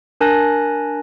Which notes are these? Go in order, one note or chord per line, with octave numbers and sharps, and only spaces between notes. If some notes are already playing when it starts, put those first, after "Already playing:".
D4 A#4 G#5 A5 F#6 A#6